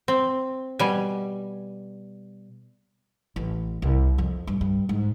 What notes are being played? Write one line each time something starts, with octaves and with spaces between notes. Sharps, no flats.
C4
B2 G3 G#5
A1
C2
F2
G2
G2
G#2